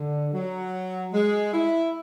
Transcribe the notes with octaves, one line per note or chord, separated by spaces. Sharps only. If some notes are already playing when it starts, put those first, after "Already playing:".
Already playing: D3
F#3
G#3
E4